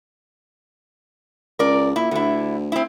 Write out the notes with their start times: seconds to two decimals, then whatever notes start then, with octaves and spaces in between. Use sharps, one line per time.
1.59 C#2 A#4 D5
1.96 A#2 E4
2.11 D2 D3 E4
2.72 C4 E4